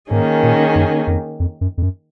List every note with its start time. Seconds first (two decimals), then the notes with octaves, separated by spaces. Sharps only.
0.11 G#2 D#3 A#3 C#4 G#4
0.43 A#2
0.75 F#2
1.07 F2
1.40 F2
1.61 F#2
1.78 F2
1.82 F#2